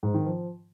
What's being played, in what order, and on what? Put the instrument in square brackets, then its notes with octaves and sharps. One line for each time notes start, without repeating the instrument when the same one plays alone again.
[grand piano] G#2
D#3
F3